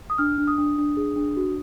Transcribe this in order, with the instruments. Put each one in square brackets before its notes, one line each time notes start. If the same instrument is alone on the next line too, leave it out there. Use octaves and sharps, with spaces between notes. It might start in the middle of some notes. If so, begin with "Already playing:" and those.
[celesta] D#6
D4 F6
D4
D#6
D4
D4
G#4
D4
F#4